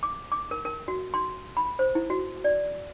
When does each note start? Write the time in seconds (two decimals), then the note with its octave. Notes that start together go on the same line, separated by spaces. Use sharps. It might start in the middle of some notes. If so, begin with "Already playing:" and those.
0.03 D6
0.32 D6
0.51 A#4
0.65 A#4
0.88 F#4
1.14 C6
1.57 B5
1.79 C5
1.95 E4
2.10 F#4
2.44 D5